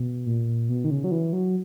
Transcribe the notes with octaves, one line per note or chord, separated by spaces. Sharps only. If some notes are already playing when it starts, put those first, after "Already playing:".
Already playing: B2
A#2
B2
D#3
C#3
F#3
E3
F#3